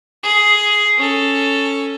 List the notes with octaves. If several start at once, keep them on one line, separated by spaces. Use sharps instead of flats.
G#4
C#4 A4